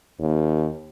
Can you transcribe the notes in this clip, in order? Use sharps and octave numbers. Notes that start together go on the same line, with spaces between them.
D#2